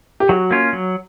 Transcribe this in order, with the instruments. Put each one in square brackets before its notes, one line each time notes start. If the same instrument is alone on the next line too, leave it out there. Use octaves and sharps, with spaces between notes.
[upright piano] G4
[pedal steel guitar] F#3 [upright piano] F#4
[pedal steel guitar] A#3 C#4 F4
F#3